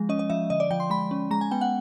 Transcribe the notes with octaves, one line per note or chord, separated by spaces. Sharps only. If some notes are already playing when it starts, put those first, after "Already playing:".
Already playing: F3 G#3
C#4 D#5
D#5
F3 E5
D3 D#5
D5
F3 G5
C6
G#3 B5
C#4
G#3 A#5
G#5
B3 G5
F#5